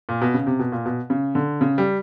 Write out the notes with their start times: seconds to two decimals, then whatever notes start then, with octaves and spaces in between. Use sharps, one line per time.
0.09 A#2
0.22 B2
0.34 C#3
0.47 C3
0.59 B2
0.72 A#2
0.86 B2
1.10 C#3
1.35 D3
1.61 C#3
1.78 G3